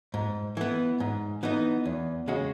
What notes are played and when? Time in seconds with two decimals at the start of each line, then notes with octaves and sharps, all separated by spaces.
0.14 G#2
0.57 E3 B3
1.00 G#2
1.43 E3 B3 D#4
1.86 E2
2.28 C#3 G#3 C#4 F#4